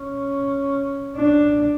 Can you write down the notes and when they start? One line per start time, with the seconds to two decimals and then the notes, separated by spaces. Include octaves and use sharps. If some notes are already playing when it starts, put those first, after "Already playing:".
Already playing: C#4
1.17 D4